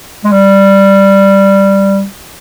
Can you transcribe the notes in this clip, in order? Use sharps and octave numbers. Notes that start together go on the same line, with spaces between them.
G#3
G3